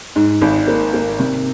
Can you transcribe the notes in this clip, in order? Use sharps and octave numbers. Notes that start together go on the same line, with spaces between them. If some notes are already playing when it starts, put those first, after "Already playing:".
G#2
G#1
A#3
A#3
C3